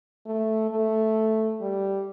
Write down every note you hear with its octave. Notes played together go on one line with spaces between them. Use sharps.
A3
A3
G3